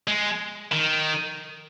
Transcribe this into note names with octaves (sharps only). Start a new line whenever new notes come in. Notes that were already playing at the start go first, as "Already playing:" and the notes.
G#3
D#3